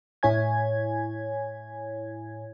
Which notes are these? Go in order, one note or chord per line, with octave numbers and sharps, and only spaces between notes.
A2 E4 C#5 G#5 G#6